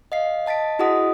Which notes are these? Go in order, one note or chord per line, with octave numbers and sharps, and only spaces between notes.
D#5 F5 C7
D#5 A5 A6 B6 D7
E4 F#4 G#4 D#5 F#5 D#6